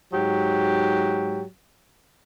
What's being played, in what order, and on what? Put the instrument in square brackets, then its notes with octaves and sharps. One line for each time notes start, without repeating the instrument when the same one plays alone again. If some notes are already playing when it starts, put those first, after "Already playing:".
[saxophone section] G#2 F#3 G4